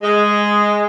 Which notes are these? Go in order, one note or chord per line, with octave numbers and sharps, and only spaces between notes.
G#3